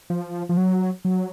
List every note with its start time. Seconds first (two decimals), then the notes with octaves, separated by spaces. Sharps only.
0.10 F3
0.49 F3
0.57 F#3
1.05 F#3